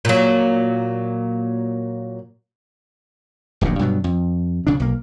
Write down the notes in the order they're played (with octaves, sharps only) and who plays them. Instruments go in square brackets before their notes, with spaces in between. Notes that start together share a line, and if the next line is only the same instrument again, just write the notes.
[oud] A#2 F#3
[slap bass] D1 A#1 D#2 A#2
G2 B2 F#3
F2
D2 C#3 D4
B1 A#3